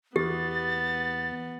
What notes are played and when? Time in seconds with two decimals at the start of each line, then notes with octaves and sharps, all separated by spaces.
0.16 E2 B3 G4 A6